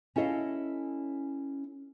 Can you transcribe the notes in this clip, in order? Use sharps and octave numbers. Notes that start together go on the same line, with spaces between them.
C#4 E4 A4 D#5 F5